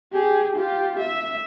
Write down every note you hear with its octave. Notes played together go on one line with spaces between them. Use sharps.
G4 G#4
F4 G4
E5